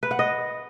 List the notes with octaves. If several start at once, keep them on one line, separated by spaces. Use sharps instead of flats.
B4
F#5
D#5